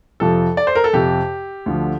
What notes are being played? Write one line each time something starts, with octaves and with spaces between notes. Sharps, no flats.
F2 C3 F3 A4
D5
C5
A#4
A4
F2 C3 F3 G4
D2 D3 F3